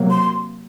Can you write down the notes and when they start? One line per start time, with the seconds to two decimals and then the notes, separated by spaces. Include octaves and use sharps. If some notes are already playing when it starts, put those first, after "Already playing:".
Already playing: C3 F#3 A#3
0.11 C6